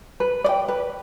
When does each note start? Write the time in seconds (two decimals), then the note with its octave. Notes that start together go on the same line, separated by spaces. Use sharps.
0.20 B4
0.44 D5
0.49 G5
0.68 B4